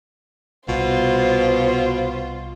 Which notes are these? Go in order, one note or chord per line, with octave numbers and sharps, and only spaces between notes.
C2 B2 F4 C5